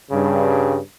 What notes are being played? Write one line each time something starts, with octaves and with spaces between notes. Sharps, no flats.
G2 C#3